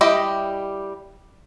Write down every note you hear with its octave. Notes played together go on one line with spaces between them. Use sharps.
G3 E4 G4 D#5